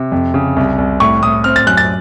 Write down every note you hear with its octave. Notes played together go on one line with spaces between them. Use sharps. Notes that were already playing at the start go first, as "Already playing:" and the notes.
Already playing: C3
F2
C#3
C2
C2
A2 C#6
A2 D#6
C4 F6
A6
F#2 F#6
A6